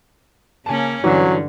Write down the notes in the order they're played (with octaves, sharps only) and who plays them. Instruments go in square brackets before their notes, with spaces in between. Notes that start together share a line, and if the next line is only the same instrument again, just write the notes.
[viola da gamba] C#3 A#3 C#4 [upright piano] G#5 A5
[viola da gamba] G2 D3 [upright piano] E3 C#4 [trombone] F#3